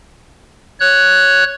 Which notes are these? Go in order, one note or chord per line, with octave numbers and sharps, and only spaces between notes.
C#5 F#6